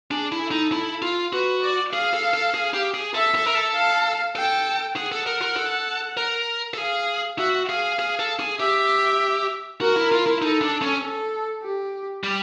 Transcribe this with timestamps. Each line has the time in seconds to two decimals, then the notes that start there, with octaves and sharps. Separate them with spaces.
0.11 D4 G#4
0.32 E4
0.42 A4
0.51 D#4
0.72 E4
1.02 F4
1.33 F#4 B4
1.63 D5
1.93 G#4 F5
2.14 A4
2.34 A4
2.54 G#4
2.74 G4
2.94 G#4
3.14 A4 E5
3.35 A4
3.46 A#4
3.55 A4
3.74 F5
4.35 A4 G5
4.96 G#4 F#5
5.12 A4
5.26 A#4
5.42 A#4
5.57 A4
6.17 A#4
6.74 A4
6.78 G#4 F5
7.38 F#4 E5
7.69 G#4 F5
7.99 G#4
8.19 A4
8.40 G#4
8.60 G4 E5
9.81 F#4 A#4
9.96 E4
10.12 F4
10.26 E4
10.42 D#4 A4
10.62 D4
10.82 C#4
11.02 A4
11.63 G4
12.24 G3